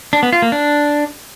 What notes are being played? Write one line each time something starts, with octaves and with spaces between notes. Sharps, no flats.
D4
B3
F4
A#3
D4